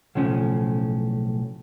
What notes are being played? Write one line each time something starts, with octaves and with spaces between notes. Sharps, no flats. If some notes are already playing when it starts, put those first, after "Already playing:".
B1 A2 C#3 F3 C#4